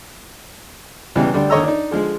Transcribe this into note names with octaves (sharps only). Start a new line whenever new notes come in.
C#2 B2 E3 G3
D2 G3 D4
D#2 D3 C#5 D#5 A#5 E6
D4 D#4
D3 F3 G#3 G#4